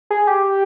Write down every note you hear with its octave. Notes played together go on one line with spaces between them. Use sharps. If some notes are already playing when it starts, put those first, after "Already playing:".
G#4
G4